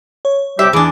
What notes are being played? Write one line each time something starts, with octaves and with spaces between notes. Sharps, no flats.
C#5
C3 G3 G4 E5
E2 D4 G#4 D6